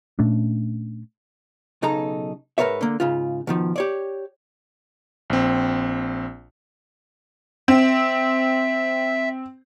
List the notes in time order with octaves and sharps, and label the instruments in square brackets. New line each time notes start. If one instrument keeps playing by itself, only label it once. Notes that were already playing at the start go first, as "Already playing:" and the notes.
[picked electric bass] A#2 A3 C#4 D4
[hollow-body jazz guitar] B1 C#3 D#4 A4 A#5
G#2 A#4 B4 C#5 E5
D3 A#3
G#2 C#3 F4
B2 D#3 F3
G4 C#5 D5
[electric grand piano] A#1 C4
[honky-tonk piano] C4 [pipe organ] E5